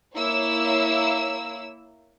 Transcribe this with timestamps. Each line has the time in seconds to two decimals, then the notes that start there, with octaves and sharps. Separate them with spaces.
0.16 A#3 E4 C#5 E6